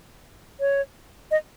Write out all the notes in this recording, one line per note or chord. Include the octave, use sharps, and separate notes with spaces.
C#5
D#5